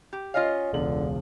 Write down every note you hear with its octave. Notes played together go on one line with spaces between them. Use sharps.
G4
C#4 F4 D#5 F5
E1 C#2 D3 F#7